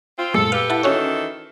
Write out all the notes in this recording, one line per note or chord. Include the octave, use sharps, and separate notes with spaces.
C4 F4
F#2 A#2 G#3 A4
G4 A4 B4 F5
E4 F#5 A5
D#3 E3 C#4 F#4 A4 C#5